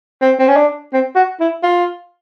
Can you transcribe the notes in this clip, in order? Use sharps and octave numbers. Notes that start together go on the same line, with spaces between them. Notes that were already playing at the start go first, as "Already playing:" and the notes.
C4
C4
C#4
D4
C4
F#4
E4
F4